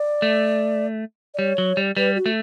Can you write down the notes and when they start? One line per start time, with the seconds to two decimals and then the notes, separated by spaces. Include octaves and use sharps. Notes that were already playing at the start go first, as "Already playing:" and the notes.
Already playing: D5
0.22 A3
1.34 D5
1.38 G3 C#5
1.58 F#3
1.77 G3
1.97 G3 B4
2.16 F#4
2.26 A3